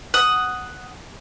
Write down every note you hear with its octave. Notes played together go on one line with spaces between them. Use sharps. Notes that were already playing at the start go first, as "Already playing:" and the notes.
F#5 D#6